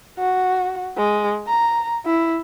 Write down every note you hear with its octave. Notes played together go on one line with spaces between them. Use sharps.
F#4
G#3
A#5
E4